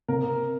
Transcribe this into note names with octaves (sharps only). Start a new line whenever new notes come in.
C3 A#4